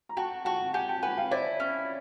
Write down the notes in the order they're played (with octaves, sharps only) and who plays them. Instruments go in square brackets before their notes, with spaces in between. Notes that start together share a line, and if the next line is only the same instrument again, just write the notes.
[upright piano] A#5
[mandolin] F#4 [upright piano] G5 A5
[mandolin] F#4 [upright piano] G5 A5
[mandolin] G4 [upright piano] F#5 G#5
[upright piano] G5 A5
[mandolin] B4 [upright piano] F#5 G#5
[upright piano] F5 G5
[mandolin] E4 [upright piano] C5 D5
[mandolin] C#4